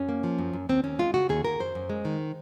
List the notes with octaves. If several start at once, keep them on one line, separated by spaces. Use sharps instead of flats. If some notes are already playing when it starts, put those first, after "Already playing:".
Already playing: F#2 C#4
A#3
F3
F#2
F#2
D#2 C4
D#2 C#4
G#3 F4
C#3 F#4
D#2 G#4
D#2 A#4
F#2 C5
F#2
G#3
D#3